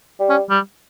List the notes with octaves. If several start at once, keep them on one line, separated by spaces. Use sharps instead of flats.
G3
C#4
G3